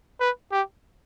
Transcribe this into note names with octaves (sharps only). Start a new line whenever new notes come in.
B4
G4